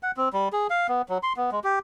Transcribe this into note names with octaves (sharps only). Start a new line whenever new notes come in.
F#5
C4
G3
G#4
F5
B3
F#3
C6
B3
G#3
G4